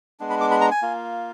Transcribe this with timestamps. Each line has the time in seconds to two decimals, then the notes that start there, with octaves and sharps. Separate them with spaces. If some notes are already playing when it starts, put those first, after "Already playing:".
0.20 G#3 B3 D4
0.30 B5
0.41 D6
0.51 B5
0.61 A#5
0.71 G#5
0.82 A#3 F4